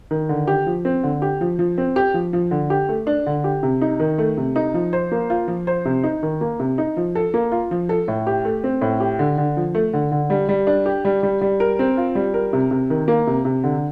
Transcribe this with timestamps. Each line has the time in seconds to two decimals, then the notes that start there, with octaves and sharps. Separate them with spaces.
0.11 D#3
0.29 D3
0.47 G4
0.66 F3
0.85 C4
1.03 D3
1.22 G4
1.41 F3
1.59 F3
1.78 C4
1.96 G4
2.14 F3
2.33 F3
2.51 D3
2.70 G4
2.89 A3
3.07 D4
3.26 D3
3.44 G4
3.63 C3
3.82 D#4
4.00 D#3
4.18 A3
4.37 C3
4.56 D#4
4.74 F3
4.93 C5
5.12 A#3
5.30 F4
5.48 F3
5.67 C5
5.85 C3
6.04 D#4
6.23 D#3
6.41 A#3
6.60 C3
6.78 D#4
6.97 F3
7.15 A4
7.34 A#3
7.52 F4
7.71 F3
7.89 A4
8.08 A2
8.27 G4
8.45 A3
8.64 C4
8.82 A2
9.00 G4
9.19 D3
9.38 D3
9.57 F3
9.75 A3
9.93 D3
10.12 D3
10.30 G3
10.49 G3
10.67 D4
10.86 G4
11.05 G3
11.23 G3
11.41 G3
11.60 A#4
11.79 C4
11.97 F4
12.15 G3
12.34 A#4
12.53 C3
12.71 C3
12.90 D#3
13.08 A#3
13.27 C3
13.45 C3
13.64 D3